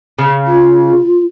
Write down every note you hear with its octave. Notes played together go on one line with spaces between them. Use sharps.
C#3
F4